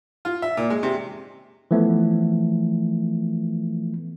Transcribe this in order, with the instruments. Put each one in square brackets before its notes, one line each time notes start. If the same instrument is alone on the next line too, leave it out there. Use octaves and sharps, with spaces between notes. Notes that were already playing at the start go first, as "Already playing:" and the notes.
[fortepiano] F4
E5
A#2
G#3
C3
[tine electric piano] E3 F3 A3 B3